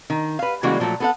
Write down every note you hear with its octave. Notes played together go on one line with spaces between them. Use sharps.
D#3
B4 F5
C#3 E3 G3 G#3 A#3 F#4
A#2 F3 F#3 A3
B3 A4 F#5